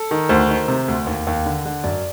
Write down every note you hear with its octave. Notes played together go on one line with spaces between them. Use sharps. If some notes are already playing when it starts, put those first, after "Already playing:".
Already playing: A4
D#3
D2 C5
D#3
C3
D2
D#2
D#2
D3
D3
F#2 D5